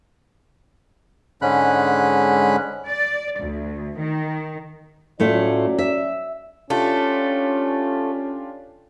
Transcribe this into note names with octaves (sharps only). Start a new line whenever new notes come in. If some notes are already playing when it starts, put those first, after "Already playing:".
G#2 D3 G#3 C#4 B5 F#6
D5
D2
D#3
A2 F#3 A3 C#4 F4 D5
E5
A3 C#4 D4 F4 G4